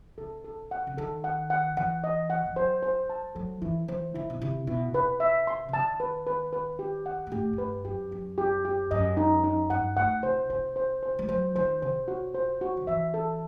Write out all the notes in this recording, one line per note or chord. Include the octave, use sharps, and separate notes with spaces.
C3 A4
A4
F#5
C3
D#3 A4
F#5
F#5
E3 F#5
D#5
F#5
E3
F#3 C5
C5
A5
F#3 A4
E3 E4
E3 C5
D#3 E4
B2
C3 E4
B2 E4
C3 B4
E5
C6
C3
D#3 A5
B4
B4
B4
G4
F#5
G2
A2 G4
A2
G2 B4
F#2 G4
F#2 G4
G4
G4
F#2 D#5
D#4
D#4
G2 F#5
A2 F#5
C3 C5
C3 C5
C5
C5
G3
F#3 C5
D#3 C5
C3 C5
F#4
C5
F#4
D#3
E3 E5
A4